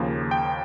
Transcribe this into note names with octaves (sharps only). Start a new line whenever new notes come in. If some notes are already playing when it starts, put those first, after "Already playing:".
Already playing: D#2 C#3 F3 A#3
G5